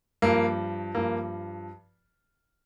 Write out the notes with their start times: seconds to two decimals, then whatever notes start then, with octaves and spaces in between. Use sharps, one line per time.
0.22 G2 F3 A#3
0.95 G2 F3 A#3